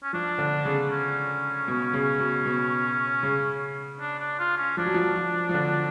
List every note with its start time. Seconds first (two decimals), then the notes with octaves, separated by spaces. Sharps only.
0.03 C#4
0.13 F3 D4
0.38 D3
0.65 C#3
0.91 C#4
1.68 B2
1.94 C#3
2.19 B2
2.46 B2
3.23 C#3
4.00 D4
4.19 D4
4.39 F4
4.57 C#4
4.77 F3 D4
4.86 F#3
4.94 F3
5.16 F3
5.49 F3
5.54 D3